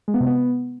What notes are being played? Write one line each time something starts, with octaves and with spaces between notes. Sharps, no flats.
G#3
B3
C3
B3